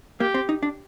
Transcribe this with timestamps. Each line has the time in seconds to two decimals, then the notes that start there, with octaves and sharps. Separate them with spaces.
0.20 A#3 G4
0.34 C4
0.49 D#4
0.63 D4